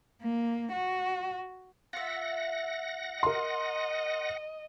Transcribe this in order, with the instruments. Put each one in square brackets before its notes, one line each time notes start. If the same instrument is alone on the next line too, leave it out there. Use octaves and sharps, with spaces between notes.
[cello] A#3
F#4
[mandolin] F4 E5 [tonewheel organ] F#5 A#6
[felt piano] A#4 C6 [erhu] D#5